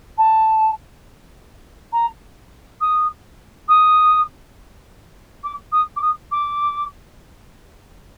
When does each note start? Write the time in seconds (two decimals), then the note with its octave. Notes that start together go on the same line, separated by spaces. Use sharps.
0.18 A5
1.92 A#5
2.81 D#6
3.68 D#6
5.44 D6
5.72 D#6
5.96 D6
6.02 D#6
6.31 D6